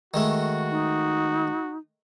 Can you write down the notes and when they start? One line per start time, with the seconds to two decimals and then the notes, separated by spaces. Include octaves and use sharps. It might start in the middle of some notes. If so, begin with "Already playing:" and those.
0.14 D#3 G#3 A3 F#4
0.71 D#4